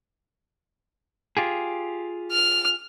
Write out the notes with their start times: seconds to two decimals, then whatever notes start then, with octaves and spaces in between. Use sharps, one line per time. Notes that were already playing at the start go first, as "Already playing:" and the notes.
1.37 F4 G4 G#4
2.31 F6